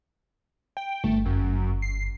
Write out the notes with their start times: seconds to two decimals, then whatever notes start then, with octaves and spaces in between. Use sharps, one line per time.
0.77 G5
1.04 G1 A3
1.26 F#2
1.82 C7